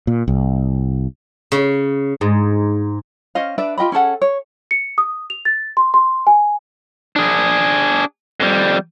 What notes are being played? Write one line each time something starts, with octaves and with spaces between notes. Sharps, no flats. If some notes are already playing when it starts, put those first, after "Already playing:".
A#2
C2
C#3
G#2
C#4 C5 D#5 F5
D4 B4 D5 E5
F4 G4 D#5 B5
C#4 G#4 A4 F#5
C#5
C#7
D#6
F7
A6
C6
C6
G#5
D4 G#4
F2 G3